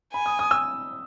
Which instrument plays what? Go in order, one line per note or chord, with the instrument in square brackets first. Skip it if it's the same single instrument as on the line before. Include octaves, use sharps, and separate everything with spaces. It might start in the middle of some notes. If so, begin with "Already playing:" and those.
[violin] G#5 [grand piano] B5
[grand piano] D#6
D#6
E6